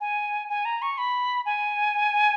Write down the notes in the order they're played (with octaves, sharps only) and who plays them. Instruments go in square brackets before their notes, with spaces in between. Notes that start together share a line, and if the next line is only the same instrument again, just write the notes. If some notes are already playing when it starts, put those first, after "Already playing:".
[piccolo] G#5
G#5
A#5
C#6
B5
G#5